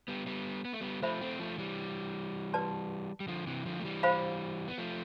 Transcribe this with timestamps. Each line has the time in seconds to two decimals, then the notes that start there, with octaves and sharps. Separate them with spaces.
0.08 G3 B3
0.27 G3 B3
0.65 B3
0.73 A3
0.81 G3 B3
1.02 F3 A3 C5 E5 B5
1.21 A3 C4
1.39 F3 A3
1.58 E3 G3
2.53 B4 D5 A5 C6
3.20 G3
3.28 D3 F3
3.47 C3 E3
3.65 D3 F3
3.79 A3
3.84 E3 G3
4.03 C5 F5 B5
4.68 B3
4.78 F3 A3